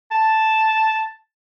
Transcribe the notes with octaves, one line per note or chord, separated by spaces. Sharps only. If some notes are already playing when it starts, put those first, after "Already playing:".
A5